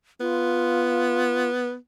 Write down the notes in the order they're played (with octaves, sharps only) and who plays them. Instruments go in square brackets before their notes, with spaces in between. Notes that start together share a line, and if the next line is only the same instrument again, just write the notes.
[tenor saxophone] B3 [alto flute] F4